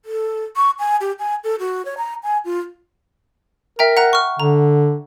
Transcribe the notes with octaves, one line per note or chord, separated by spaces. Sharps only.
A4
C#6
G#5
G4
G#5
A4
F#4
C#5
A#5
G#5
F4
A#4 E5 G5 A#5
F#5 A#5 F#6
C#6 F6
D3 A#5